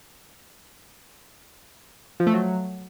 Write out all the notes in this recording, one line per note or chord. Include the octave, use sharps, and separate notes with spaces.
F3
A3
F#3